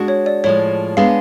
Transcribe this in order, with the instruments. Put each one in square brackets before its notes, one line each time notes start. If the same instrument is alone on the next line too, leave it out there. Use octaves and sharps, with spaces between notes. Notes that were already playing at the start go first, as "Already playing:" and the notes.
Already playing: [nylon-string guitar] G#3 D4 F#4
[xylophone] C#5
D5
[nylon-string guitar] A2 F3 G#3 [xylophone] C#5
[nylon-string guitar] G#3 B3 D4 G#4 [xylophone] F5